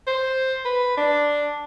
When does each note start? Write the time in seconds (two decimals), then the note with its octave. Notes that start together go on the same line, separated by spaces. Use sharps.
0.07 C5
0.65 B4
0.97 D4